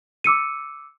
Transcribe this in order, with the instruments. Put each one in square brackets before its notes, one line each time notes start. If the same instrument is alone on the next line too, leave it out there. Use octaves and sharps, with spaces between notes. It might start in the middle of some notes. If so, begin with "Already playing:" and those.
[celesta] D6 E6 C#7 D#7